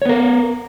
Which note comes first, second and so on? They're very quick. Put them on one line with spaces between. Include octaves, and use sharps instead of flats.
C#5 B3 A#4